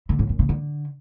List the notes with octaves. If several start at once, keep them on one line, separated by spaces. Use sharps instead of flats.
D3
A2
F#2
C#3
D3